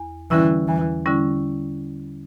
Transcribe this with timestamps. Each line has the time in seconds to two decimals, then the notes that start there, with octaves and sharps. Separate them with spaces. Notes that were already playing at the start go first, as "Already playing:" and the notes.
Already playing: E2
0.31 D3 E3 G3 C#4 E4
0.68 E2 E3
1.06 D3 G3 C#4 E4